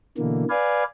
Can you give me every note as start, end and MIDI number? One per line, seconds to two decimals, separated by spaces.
0.18 0.45 47
0.18 0.45 50
0.18 0.45 52
0.18 0.45 58
0.50 0.84 71
0.50 0.84 74
0.50 0.84 77
0.50 0.84 80